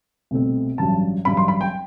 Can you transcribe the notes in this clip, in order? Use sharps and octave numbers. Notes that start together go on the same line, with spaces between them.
C2 B2 A3 C4
A1 G2 F#3 A5
A1 G2 F#3 B5
C6
B5
G5